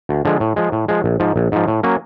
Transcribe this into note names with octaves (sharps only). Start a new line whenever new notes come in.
D2
D3 F3 G#3
A2
F3 G#3
A2
F3 G#3
A#1
G#2 F3
A#1
G#2 F3
A2
F#3 A#3 C#4